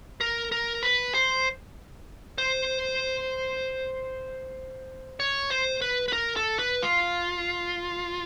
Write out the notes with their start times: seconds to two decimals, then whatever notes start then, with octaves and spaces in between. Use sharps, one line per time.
0.21 A#4
0.52 A#4
0.83 B4
1.14 C5
2.38 C5
5.20 C#5
5.50 C5
5.82 B4
6.08 B4
6.13 A#4
6.36 A4
6.59 B4
6.83 F4